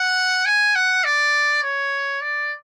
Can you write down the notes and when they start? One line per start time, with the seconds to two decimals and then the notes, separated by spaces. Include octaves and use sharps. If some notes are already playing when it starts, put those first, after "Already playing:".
Already playing: F#5
0.46 G#5
0.75 F#5
1.04 D5
1.63 C#5
2.21 D5